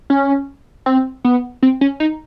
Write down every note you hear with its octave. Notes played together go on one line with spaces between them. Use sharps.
C#4
C4
B3
C4
C#4
D#4